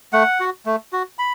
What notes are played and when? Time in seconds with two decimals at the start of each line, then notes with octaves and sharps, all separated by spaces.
0.13 A3 F#5
0.40 F#4
0.66 A3
0.93 F#4
1.19 B5